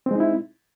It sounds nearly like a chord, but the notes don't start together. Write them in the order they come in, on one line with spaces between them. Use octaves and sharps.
C4 G#3 D#4 E4